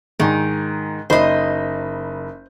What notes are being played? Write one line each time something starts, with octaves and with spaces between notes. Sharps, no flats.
G#2 D#3 G#5
F#1 D#4 C5 D#5 B5